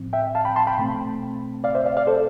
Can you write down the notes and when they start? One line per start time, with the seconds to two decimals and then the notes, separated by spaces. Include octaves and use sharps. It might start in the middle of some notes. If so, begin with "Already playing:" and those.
Already playing: A2 F3 C4
0.13 E5 G5
0.35 F5 A5
0.45 G5 B5
0.56 A5 C6
0.67 G5 B5
0.78 B2 A3 C4
1.64 D5 F5
1.75 C5 E5
1.86 D5 F5
1.97 D5 F5
2.07 A4 C5